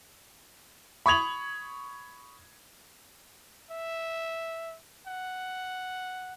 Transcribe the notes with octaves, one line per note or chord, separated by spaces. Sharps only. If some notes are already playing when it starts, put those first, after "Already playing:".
B5 C#6 D#6 G#6 F7 F#7
E5
F#5